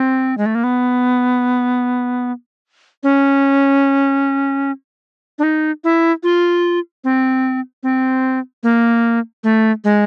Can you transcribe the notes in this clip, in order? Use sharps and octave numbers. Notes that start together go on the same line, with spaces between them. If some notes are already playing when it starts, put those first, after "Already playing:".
Already playing: C4
G#3
A3
A#3
B3
C#4
D4
D#4
E4
F4
C4
C4
A#3
A3
G#3